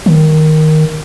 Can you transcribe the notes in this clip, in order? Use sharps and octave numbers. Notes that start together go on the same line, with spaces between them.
D#3